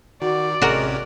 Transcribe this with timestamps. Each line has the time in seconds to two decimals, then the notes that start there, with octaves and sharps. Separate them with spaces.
0.22 D#3 F#4 D5
0.62 A1 C3 G#3 C#4 F#4 A#4